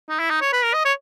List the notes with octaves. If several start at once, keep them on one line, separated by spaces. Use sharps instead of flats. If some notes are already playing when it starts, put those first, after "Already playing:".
D#4
E4
D#4
C#5
B4
A#4
D#5
C#5